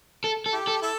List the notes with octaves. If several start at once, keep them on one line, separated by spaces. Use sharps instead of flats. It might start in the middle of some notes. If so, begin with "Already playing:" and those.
A4
A4
E4 G4
A4
E4 A4